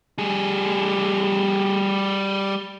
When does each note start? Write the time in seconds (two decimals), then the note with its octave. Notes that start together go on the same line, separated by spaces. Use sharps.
0.18 G3 G#4